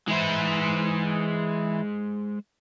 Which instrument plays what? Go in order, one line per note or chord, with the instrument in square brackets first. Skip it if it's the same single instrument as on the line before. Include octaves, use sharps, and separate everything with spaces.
[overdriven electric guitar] E3 E4 [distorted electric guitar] G#3 C5